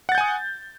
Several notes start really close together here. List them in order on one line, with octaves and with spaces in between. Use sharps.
F#5 A6 G6 G#5 D#6